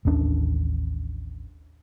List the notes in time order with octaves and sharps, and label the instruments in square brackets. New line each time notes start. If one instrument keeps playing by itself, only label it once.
[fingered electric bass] A1 D#2 C#4 D4